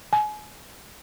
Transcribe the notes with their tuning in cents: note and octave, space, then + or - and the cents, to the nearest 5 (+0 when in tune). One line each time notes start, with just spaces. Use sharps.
G#5 +30